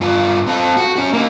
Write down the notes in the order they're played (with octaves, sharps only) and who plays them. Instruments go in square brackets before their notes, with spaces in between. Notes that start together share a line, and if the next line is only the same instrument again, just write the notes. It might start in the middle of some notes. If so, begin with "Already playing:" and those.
[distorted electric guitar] G2 F4
C4 A4
F#4
C#4 F#4
A#3 D#4